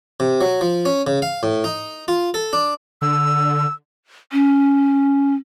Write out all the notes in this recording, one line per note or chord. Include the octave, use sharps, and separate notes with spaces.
C3
F#3
F3
C#4
C#3
F5
A2
D#4
F4
A4
D4
D3 E6
C#4